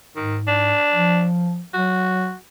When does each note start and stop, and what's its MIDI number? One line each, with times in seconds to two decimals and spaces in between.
0.16 0.74 44
0.16 0.36 51
0.47 1.25 62
0.91 1.63 53
1.74 2.34 54
1.74 2.35 66